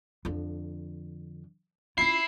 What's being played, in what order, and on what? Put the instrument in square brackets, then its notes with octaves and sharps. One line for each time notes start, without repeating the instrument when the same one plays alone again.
[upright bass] F2 D3
[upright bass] C#4 F4 [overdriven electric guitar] E4 [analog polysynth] C7